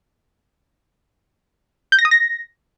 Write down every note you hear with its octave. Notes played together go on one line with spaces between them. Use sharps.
G6
A#6
D#6
A#6